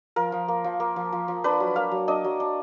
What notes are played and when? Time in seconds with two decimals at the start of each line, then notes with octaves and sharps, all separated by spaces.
0.16 F3 A#4
0.32 F3
0.48 A#3
0.64 F3
0.80 A#3
0.96 F3
1.13 F3
1.28 F3
1.44 D4 B4
1.60 F#3
1.76 A#3 F5
1.92 F#3
2.08 D4 D#5
2.24 F#3
2.40 D4